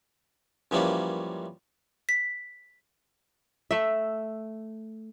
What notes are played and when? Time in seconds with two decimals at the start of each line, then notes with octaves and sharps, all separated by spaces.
0.71 F#2 E3 F3 G3 A#3 C#4
2.09 B6
3.71 A3 E5